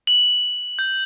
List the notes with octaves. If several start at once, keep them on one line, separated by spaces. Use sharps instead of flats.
F#7
G6